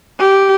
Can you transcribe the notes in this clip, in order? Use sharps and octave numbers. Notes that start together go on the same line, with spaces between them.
G4